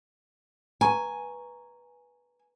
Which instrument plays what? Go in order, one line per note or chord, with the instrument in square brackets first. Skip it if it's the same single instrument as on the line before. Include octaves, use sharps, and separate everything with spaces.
[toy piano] B4 A#5 C#6 [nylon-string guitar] G#5